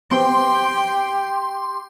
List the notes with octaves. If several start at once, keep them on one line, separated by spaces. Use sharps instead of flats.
B3 C4 G4 G5 C6